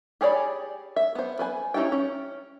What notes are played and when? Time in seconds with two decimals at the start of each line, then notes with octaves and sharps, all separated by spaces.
0.21 G4 G#4 C#5 D5 B5
0.96 E5
1.15 B3 C5
1.39 B4 C5 G#5
1.74 C#4 D#4 E4 G4 G5
1.92 C#4